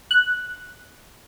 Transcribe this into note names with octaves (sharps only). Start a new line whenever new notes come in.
F#6